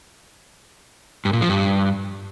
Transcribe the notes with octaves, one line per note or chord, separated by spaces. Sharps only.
G2
A#2
F3
G2